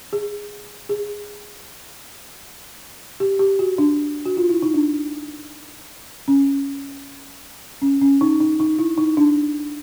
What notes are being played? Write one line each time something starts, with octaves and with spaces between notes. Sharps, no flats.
G#4
G#4
G4
G4
F#4
D4
F#4
F4
E4
D#4
D4
C#4
C#4
C#4
D#4
D#4
D#4
E4
D#4
D4